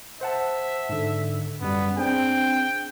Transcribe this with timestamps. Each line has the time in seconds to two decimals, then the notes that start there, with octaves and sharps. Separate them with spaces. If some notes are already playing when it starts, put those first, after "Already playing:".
0.21 C5 E5 F#5 A5
0.89 G#2 D3
1.61 F#2 G3 B3
1.97 C4 D4 G#4 G5